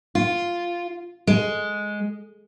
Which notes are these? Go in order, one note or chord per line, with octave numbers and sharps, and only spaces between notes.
F4
G#3